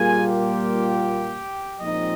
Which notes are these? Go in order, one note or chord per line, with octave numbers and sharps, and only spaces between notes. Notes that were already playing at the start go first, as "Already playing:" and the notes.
Already playing: A#2 G3 A#3 F4 G#4 G#5
G4 G5
A#2 F3 G#3 C4 D#4 D#5